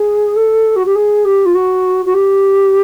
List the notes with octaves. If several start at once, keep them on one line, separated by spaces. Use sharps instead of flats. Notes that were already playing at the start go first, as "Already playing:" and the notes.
Already playing: G#4
A4
F#4
G4
G#4
G4
F4
F#4
F#4
G4